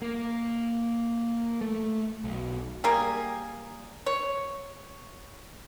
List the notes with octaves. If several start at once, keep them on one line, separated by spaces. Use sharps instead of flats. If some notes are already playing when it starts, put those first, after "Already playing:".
A#3
A3
B1
G3 A#3 G#4
C#5